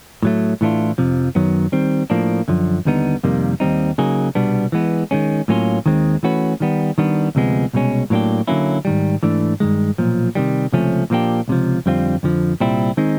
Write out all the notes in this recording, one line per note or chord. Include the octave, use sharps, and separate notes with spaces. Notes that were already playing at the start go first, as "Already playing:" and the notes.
A2 F#3 A3
A2 E3 A3 D4 F4
F2 C3 F3
F#2 D#3 F#3 B3
D#3 G3 C4
A2 F3 A#3 D4
F#2 D3 F3
D#2 D3 G3 B3 D#4
F2 C3 D#3 G3 A#3
D#2 D#3 G3 C4 D#4
C#3 F#3 A#3 D#4 G#4
C2 B2 G3 B3 D4
E3 G#3 B3
D#3 G#3 C#4
A2 F#3 A#3 C#4 F4
D#2 D#3 G#3 C4
E3 A3 C#4 F#4 B4
D#3 G3 B3
D#3 G3 B3 D4
D2 C3 F3 G#3 B3
C2 B2 G#3 C#4
A2 F#3 A#3 D4 G4
D3 F#3 A#3 C#4 E4
G#2 D#3 G3
G#2 E3 A3 D4
G2 D#3 G#3
B1 A#2 F3
C3 D#3 G3
C#2 C3 F3 A3 C#4
A#2 F3 A#3 D4 G4
C#2 C3 F3
F2 D3 G3 C4 F4
F2 D3 F3
C2 A#2 G3 C4 E4
D#3 G#3 C4 D#4